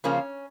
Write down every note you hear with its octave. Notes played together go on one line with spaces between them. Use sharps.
C#3 F3 A#3 C#4